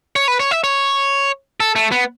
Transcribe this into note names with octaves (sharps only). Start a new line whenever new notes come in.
C#5
B4
C#5
E5
C#5
A4
A3
B3